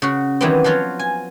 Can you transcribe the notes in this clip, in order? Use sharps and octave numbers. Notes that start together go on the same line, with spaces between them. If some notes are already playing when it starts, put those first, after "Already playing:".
C#3 F#4
D#3 E3 F#3 G3 B3 C4
F3 F#3 F4 F#4 C#5
G#5